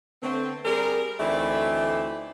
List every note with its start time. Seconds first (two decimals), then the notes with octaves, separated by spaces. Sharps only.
0.23 D3 A3 B3 C4
0.65 G3 C4 G#4 A#4
1.20 D2 E3 A3 C4 D#4 D5